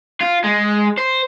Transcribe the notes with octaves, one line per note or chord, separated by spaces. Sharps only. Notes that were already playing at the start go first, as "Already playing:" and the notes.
F4
G#3
C5